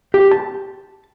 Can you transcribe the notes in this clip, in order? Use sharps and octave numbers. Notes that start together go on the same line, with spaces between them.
G4
A5